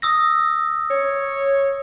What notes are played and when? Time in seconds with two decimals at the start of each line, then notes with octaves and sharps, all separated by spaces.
0.02 D#6 E6 A#6
0.91 C#5